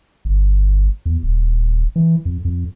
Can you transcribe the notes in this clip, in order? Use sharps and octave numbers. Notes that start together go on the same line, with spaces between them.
G1
E2
D#1
E3
F2
F2